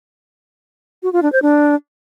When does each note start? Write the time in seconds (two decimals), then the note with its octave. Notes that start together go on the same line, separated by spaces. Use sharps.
1.03 F#4
1.13 F4
1.23 D4
1.32 C5
1.42 D4